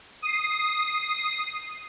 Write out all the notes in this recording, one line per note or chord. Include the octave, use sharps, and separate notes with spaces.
D#6 C7